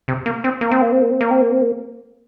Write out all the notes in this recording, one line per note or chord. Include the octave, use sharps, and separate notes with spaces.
C3
A#3
C4
A#3
C4
A#3
C4
A#3
C4
A#3
C4
A#3
C4
A#3